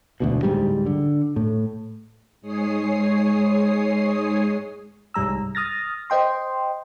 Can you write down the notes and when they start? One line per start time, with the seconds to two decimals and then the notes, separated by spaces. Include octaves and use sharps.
0.20 E1 D2 B2
0.43 D1 C#2 G#2 G3
0.86 D3
1.36 A2
2.41 G#2 G#3 G#4 C#5 D#6 C7
5.14 C2 G#2 G3 A#5 E6
5.55 D#6 F6 A6 A#6
6.10 C5 D#5 G5 C6